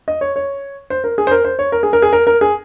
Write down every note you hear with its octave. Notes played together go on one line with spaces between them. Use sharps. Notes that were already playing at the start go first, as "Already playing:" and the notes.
D#5
C#5
C#5
C5
A#4
G#4
C5
A#4
C5
C#5
A#4
G#4
A#4
G#4
A#4
A#4
G#4